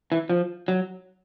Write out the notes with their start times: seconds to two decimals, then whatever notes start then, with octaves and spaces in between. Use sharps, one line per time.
0.12 E3
0.29 F3
0.68 F#3